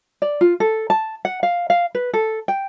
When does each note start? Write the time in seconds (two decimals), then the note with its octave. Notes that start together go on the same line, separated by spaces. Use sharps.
0.22 D5
0.41 F4
0.60 A4
0.90 A5
1.25 F#5
1.43 F5
1.70 F5
1.95 B4
2.13 A4
2.48 G5